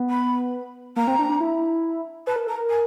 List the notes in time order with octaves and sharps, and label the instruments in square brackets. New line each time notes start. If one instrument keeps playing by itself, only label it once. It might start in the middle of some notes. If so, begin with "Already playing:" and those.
Already playing: [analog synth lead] B3
[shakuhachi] B5
[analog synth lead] A#3 [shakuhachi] A#5
[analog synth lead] C4
D4
D4
E4
[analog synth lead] B4 [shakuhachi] A5
[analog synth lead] A#4
[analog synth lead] A4 [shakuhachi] A#5
[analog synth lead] A#4
[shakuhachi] G#5